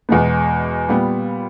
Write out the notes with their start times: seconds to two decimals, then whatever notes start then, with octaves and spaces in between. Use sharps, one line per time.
0.09 E2 B2 G#3 B3
0.88 A#2 G3 B3